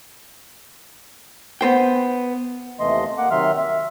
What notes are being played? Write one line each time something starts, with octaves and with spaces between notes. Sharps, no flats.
B3 C5 G5
D#2 C3 E3 A3 D#5 C6
A#3 F#5 D6
C3 D#3 F#3 E5 C6 F6
E5